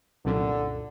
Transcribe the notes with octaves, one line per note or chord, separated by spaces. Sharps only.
C2 F#2 A#2 D3